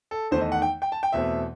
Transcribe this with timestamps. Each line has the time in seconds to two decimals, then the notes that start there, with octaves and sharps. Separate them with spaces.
0.11 A4
0.31 E2 D#3 A3 C5
0.41 D#5
0.52 F#5
0.62 G5
0.82 G5
0.92 A5
1.03 G5
1.12 E2 B2 A3 C4 E5